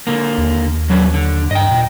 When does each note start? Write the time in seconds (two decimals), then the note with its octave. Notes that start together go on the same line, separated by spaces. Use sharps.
0.07 D3 A#3
0.38 D#2
0.90 F#3 C#4 B4
1.14 D3
1.51 G2 D#5 G5
1.71 A#2